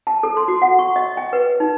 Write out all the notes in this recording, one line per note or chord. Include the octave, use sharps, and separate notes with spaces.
A5
A4
C6
F#4
F#5
C#6
D#5
G5
B4
D#4